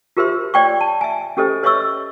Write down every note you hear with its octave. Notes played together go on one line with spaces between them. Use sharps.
F4 G4 A#4 C5 E5 C6
C#5 D5 G5 C#6
A5
E5 G#5
C#4 G4 A4 C5 D#5
B4 C#5 D#5 E5 C#6 E6